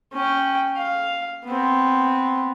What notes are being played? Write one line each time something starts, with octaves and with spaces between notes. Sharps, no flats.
C#4 G5
F5
B3 C4